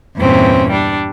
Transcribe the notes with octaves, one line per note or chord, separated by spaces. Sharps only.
E2 G2 A#2 C4 C#4
G3 D4